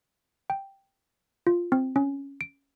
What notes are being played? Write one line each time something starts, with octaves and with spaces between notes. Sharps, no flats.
G5
F4
C4
C#4
D7